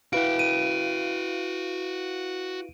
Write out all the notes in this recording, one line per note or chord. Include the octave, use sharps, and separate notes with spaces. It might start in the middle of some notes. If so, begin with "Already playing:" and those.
E4 F#4 B4 F5 G5 D7
D#7